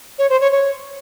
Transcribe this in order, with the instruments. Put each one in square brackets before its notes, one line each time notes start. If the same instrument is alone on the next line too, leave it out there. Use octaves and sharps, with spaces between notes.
[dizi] C#5
C5
C#5
C#5